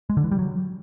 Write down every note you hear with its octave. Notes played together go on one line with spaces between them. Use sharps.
G#3
D3
E3
G3
F#3